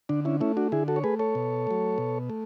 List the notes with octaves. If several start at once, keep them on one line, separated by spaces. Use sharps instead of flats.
D3 D4
C#4 E4
A3 C#4 E4
D4 F#4
D3 E4 G#4
F#4 A4
C#5
A3 G#4 B4
A4 C#5
B2
F#3 A3
B2
A3